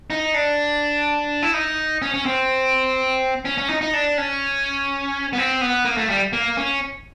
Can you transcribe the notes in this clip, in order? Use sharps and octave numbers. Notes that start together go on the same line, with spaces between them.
D#4
D4
E4
D#4
C#4
C#4
C4
C#4
C#4
D#4
D#4
D4
C#4
B3
C4
B3
A#3
A3
G3
A#3
C#4